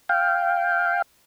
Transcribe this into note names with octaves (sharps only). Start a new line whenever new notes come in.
F5 G5